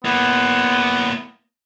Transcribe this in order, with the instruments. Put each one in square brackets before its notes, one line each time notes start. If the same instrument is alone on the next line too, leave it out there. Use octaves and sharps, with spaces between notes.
[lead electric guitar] A#3 E4 [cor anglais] B3